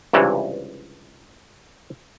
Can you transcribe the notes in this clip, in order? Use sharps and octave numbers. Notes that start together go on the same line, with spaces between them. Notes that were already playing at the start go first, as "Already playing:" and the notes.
C#2 G2 C3 E3